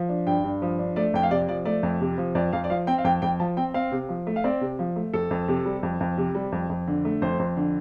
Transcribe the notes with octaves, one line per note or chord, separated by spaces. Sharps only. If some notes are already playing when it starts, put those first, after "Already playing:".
Already playing: F3
D4
G2 G5
G2
F3
D4
A3 D5
F2 G5
F5
C3 D5
F3 D5
A3 D5
F2
C3
F3
F2 D5
F2 F5
D5
F3 F5
C4 G5
F5
F2 G5
F2 G5
F3 A5
C4 G5
C4 F5
C3
F3
A3
F5
C4 D5
C3
F3
A3
F2 A4
F2
C3
G3
F2
F2
C3
G3
F2
F2
D3
A3
F2 C5
F2
D3